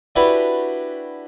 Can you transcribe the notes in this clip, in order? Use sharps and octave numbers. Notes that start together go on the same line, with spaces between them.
D4 E4 F#4 G4 B4